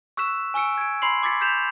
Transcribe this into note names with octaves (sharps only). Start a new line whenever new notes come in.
C#6 E6 F#6 B6 E7
G#5 C#6 E6 C#7 D7
G#6 D7
B5 C6 C7 F#7
D6 G#6 A6 B6 C#7
G6 B6 E7 F7